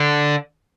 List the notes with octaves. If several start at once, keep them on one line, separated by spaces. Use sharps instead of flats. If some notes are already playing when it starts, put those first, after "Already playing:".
Already playing: D3